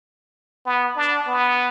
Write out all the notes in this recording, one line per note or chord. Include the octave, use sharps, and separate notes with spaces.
B3
D4
B3